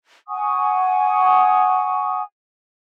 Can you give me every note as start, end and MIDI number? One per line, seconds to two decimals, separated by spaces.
0.28 2.22 78
0.28 2.22 80
0.28 2.22 85
0.28 2.22 87